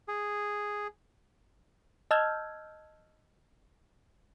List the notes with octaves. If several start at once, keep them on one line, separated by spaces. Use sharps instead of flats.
G#4
D#5 A5 E6 F6 G6 G#6